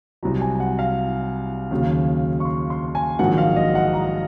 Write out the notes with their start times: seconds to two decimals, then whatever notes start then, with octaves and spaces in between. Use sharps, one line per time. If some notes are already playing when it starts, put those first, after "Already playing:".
0.23 C2 C3 F#3 A#5
0.41 G#5
0.60 F#5
0.79 F5
1.71 D#2 C#3 F#3
2.40 C#6
2.45 C6
2.70 C6
2.95 G#5
3.19 A#1 G#2 D#3 F#3 F#5
3.38 F5
3.56 D#5
3.75 F#5
3.93 A#5